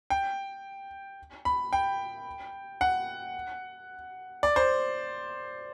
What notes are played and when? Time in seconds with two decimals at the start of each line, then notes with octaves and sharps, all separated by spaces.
0.10 G5
1.45 B5
1.73 G5
2.81 F#5
4.43 D5
4.56 C5